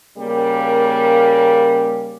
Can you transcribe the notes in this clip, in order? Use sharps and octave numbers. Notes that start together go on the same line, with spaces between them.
C#3 G3 A#3